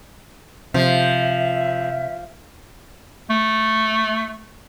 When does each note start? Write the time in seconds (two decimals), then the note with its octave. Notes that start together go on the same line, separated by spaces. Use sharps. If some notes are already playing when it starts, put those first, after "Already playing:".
0.74 C3 F3 E5
3.30 A3